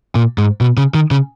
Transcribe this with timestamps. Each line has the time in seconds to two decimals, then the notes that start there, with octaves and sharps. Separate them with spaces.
0.15 A#2
0.38 G#2
0.61 B2
0.77 C#3
0.94 D#3
1.11 C#3